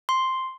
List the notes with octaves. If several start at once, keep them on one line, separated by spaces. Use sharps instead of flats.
C6